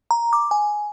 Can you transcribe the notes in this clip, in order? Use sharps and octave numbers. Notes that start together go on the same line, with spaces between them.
A#5
D6
G#5